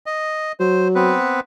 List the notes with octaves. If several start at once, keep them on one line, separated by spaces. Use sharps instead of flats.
D#5
F#3 C5
B3 C4 B4